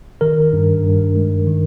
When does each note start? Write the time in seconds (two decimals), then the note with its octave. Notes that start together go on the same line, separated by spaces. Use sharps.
0.21 D#3 A#4
0.53 G2
0.83 G2
1.16 G#3
1.47 D#3